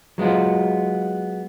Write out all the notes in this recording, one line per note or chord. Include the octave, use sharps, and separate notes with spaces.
F#3 G#3 B3 F4